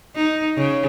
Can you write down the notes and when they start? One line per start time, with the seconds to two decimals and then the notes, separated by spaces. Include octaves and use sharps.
0.16 D#4
0.57 C#3